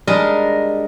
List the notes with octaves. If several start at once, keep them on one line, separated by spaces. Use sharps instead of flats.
G3 G#3 D4 G#4 A#4 D#5